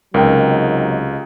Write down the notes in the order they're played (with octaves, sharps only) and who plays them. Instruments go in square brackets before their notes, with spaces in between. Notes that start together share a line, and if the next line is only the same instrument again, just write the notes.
[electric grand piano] C#2 [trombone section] C3 F#3 D#4 [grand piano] A#4 G5